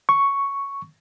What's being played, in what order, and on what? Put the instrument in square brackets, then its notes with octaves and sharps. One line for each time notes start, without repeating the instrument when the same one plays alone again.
[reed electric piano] C#6